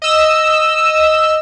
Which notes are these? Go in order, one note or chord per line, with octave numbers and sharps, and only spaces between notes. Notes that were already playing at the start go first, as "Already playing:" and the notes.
D#5 E6